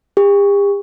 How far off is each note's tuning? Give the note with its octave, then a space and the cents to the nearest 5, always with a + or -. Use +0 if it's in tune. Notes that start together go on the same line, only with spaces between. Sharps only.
G4 +45